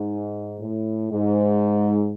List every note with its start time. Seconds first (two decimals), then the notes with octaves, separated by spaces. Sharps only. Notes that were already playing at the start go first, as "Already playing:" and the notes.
Already playing: G#2
0.60 A2
1.10 G#2